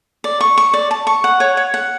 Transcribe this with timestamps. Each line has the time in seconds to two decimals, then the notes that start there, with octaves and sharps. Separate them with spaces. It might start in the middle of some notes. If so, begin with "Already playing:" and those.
0.24 D5
0.41 C#6
0.58 C#6
0.74 D5
0.91 A5
1.07 C#6
1.24 F#5
1.40 C#5
1.57 C#5
1.74 F#5